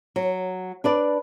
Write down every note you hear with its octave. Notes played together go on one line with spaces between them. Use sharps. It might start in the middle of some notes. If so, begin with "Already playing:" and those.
F#3
D4 B4 D5